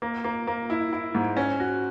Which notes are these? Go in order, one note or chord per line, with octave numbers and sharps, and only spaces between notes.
A#3
A#3
A#3
E4
E4
G#2
C#4
F#4